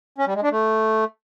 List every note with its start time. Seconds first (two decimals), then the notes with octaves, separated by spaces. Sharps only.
0.18 C#4
0.27 G3
0.35 G#3
0.43 D4
0.51 A3